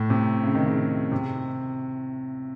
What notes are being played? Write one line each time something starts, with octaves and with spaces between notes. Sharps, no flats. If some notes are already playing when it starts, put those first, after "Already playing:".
Already playing: A2
C3
C#3
D#3
C#3
C3